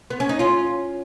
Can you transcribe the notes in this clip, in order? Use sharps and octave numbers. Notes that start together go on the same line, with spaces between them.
B3
C#4
D#4
C#4 F4